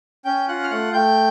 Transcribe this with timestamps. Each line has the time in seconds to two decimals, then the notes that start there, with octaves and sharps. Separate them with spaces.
0.25 C#4 G5 G6
0.48 F4 F#5 F#6
0.64 F6
0.70 A3 F#5 F#6
0.93 A3 G5 G6